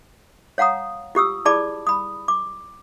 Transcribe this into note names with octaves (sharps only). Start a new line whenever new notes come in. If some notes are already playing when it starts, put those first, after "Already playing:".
C#5 F5 F#5 A#5 D#6
F4 G4 D#6 E6
E4 G#4 D5 A5 B5 D6
B5 D#6
D6